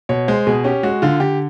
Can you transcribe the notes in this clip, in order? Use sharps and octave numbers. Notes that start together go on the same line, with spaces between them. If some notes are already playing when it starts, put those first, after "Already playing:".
B2 C#5
G#3 C5
B2 G#4
C#4 G4
G#3 F#4
D3 F4
D3 G4